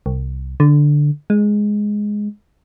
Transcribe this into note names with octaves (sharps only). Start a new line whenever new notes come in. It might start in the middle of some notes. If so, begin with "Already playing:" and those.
C2
D3
G#3